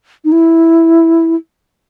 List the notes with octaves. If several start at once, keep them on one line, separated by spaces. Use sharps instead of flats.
D#4
E4